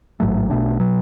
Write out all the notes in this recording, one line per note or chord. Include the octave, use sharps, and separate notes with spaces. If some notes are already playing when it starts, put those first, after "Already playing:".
A1 G#2 F#3 A3
B1 B2 A3 D4
B2 F#3